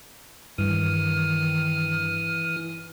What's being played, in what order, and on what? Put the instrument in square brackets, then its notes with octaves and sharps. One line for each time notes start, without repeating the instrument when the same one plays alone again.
[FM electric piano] G2 [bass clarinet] D#3 [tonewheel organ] E3 D#6 [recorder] F6